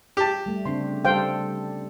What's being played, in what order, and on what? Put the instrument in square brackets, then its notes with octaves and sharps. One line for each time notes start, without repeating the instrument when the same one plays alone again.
[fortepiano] G4 A5
[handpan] G3 A3
[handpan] C#3 C4 D4 [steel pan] C6
[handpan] G3 A4 [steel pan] C5 F5 G5